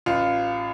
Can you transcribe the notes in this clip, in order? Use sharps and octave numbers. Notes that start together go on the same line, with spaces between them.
A1 F4